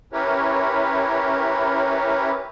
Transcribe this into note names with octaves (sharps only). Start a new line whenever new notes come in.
C#4 E4 G4 A#4 B4 C#5